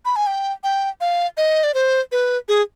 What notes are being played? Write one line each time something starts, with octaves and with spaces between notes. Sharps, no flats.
B5
G#5
G5
G5
F5
D#5
D5
C5
B4
G#4